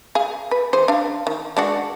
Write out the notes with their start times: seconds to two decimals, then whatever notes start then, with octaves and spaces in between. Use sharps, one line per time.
0.15 G#4 F5
0.51 B4
0.73 E3 G#4 C5
0.88 D4 F5
1.27 D#3
1.57 G#3 D4 F#4